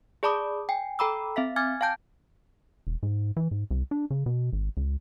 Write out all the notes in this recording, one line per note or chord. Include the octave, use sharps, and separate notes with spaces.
G#4 D5 A5 B5 D6 D#6
G5 G#5
A4 G5 A#5 B5 D6 E6
C4 E5 F5 B6
G#5 D6 F6 G#6 A6
F5 G5 A5 G6
E1
G#2
E3
G#2
C2
D4
C#3
B2
G#1
C#2